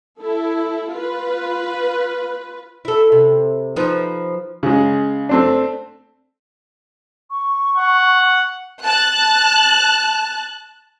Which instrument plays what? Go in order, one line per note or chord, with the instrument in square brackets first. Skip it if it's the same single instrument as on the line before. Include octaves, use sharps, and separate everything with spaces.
[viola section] E4 A4
F4 B4
[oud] E4 A4
C3
F3 D#4 B4
[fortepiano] C#3 G#3
A3 C4 D4
[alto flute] C#6
[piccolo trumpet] F#5
[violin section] A5 F#6